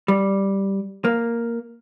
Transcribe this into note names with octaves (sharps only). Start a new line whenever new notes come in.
G3
A#3